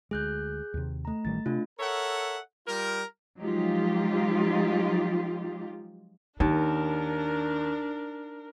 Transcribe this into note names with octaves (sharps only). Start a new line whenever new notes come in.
D2 G#3 G#4 F#6 G6
D#2 C3
A3 A#5
A1 D#3 G3 A6
C3 A3 D4 F4
A4 A#4 C#5 E5 F#5
G3 F4 A#4
F3 F#3 G#3 D#4 F4 G4
D#2 D4 D#4 A#4